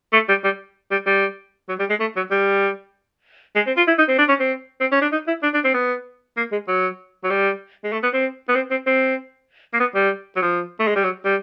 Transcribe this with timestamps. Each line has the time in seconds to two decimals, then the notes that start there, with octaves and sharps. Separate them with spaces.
0.13 A3
0.29 G3
0.44 G3
0.91 G3
1.06 G3
1.69 F#3
1.79 G3
1.90 G#3
2.00 A3
2.16 F#3
2.31 G3
3.56 G#3
3.67 C4
3.77 F4
3.87 E4
3.98 D#4
4.08 C4
4.18 D4
4.28 C#4
4.40 C4
4.80 C4
4.92 C#4
5.02 D4
5.12 D#4
5.27 E4
5.43 D4
5.54 D4
5.64 C4
5.74 B3
6.37 A#3
6.52 G#3
6.68 F#3
7.24 F#3
7.30 G3
7.84 G#3
7.92 A3
8.03 B3
8.13 C4
8.48 B3
8.55 C4
8.71 C4
8.86 C4
9.74 A#3
9.80 B3
9.95 G3
10.36 F#3
10.42 F3
10.79 A3
10.87 G#3
10.96 G3
11.04 F#3
11.25 G3